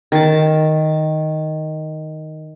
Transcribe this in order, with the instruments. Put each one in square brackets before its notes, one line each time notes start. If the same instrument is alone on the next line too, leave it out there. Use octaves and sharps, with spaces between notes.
[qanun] D#3 A5